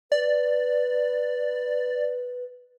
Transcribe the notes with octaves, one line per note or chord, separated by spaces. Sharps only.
B4 D5